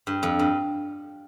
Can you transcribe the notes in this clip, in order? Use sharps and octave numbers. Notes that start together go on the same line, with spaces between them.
G2
F2
G2